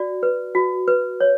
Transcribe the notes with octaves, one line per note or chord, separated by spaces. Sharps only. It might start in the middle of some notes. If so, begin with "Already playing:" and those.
Already playing: F#4 D5
B4
F#4
B4
C#5